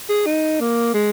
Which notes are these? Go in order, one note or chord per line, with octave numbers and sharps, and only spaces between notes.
G#4
D#4
A#3
G#3